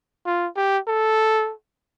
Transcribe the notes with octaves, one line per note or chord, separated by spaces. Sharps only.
F4
G4
A4